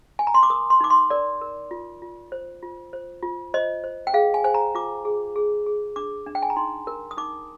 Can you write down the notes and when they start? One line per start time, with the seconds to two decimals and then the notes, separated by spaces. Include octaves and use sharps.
0.19 G#5
0.27 A#5
0.34 C6
0.43 D6
0.50 A#4 D#6
0.70 C6
0.81 D#4 D6
0.90 C6
1.10 A#4 D5
1.41 A#4
1.71 F4
2.02 F4
2.32 C5
2.63 F4
2.93 C5
3.23 F4
3.54 C5 D#5
3.84 C5
4.07 G5
4.14 G#4 F5
4.34 G#5
4.44 C5 G#5
4.54 A#5
4.75 F4 D6
5.05 G#4
5.36 G#4
5.66 G#4
5.96 D4 D6
6.26 D4
6.35 G5
6.43 G#5
6.50 A#5
6.56 D#4 C6
6.87 A#4
7.11 D#6
7.17 D#4 D6